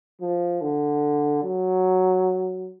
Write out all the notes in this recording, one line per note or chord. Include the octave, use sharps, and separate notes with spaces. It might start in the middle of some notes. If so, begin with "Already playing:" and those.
F3
D3
F#3